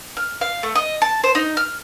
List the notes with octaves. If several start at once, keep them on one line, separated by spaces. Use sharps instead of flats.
F6
F5
A3
D#5
A5
C5
D#4
F6